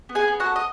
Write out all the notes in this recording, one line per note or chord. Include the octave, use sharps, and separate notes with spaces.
B3
G#4 G#5
B3
F#4 F#5
A4
D#5